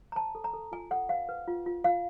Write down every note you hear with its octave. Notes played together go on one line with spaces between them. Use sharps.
A#5
C5 A5
A4
A#5
A4
F4 G#5
A4 F#5
C5 F5
B4
F4
F4
F4 F5